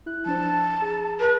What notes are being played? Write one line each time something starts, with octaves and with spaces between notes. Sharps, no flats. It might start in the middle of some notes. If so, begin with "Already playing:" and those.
E4 F#6
F3 D4 C5 A5
G#4 A#5
B4